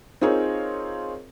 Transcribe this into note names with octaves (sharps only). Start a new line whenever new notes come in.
C4 D#4 F4 G#4 A#4 C#5